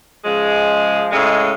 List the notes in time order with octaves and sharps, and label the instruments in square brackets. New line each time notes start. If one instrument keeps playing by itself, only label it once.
[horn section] C#3 F3 G#3
A2 C#3 G#3